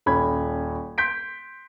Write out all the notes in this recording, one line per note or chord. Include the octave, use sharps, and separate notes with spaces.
D#1 C#4 B5 G#6
C6 G6 B6 D7